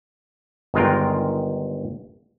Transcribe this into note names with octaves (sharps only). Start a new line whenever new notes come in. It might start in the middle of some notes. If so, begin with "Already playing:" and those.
G1 D#3 G#3 F4 A#4 G5